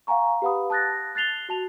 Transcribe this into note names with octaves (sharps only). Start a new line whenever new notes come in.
F5 F#5 G#5 A#5 C#6
G4 B4 F5 F#5 B5 D#6
A5 D#6 F#6 A6 A#6
F#6 A6 C7 F7 G7
F#4 A5 F7